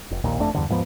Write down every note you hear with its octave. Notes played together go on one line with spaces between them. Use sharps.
F1
D1 A#1 D#2 A#2
G1 F2 A3 D4
E2 G2 D3
D#2 G#2 F3 B3